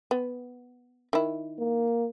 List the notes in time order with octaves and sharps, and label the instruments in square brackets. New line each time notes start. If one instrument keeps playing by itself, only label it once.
[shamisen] B3
D#3 E4
[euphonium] A#3